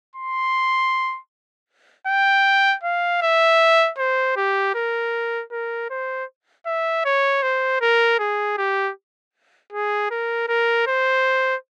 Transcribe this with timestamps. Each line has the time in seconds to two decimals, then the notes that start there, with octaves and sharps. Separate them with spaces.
0.16 C6
2.07 G5
2.83 F5
3.22 E5
3.98 C5
4.37 G4
4.75 A#4
5.51 A#4
5.90 C5
6.66 E5
7.05 C#5
7.43 C5
7.81 A#4
8.19 G#4
8.57 G4
9.73 G#4
10.11 A#4
10.48 A#4
10.87 C5